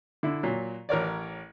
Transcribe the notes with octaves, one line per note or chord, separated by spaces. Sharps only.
D3 E4
A#2 F#3
A1 A#4 C#5 D5